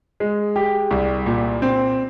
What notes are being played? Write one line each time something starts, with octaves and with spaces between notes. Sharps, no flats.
G#3
G4
C2
A#2
C4